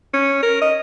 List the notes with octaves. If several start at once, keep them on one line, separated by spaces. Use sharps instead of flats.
C#4
A#4
D#5